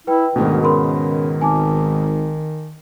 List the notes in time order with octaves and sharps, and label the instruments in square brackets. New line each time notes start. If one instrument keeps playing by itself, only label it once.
[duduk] E4 [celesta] B4 G5
[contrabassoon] D2 [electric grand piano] G#2 B2 [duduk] D#3
[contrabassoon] C#3 [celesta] A#4 B5 C6
[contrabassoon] G#1 [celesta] G#5 A5 D6